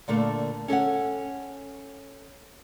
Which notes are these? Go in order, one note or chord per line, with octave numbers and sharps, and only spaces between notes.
A#2 D3 A3 A#3
C#4 A4 C#5 F#5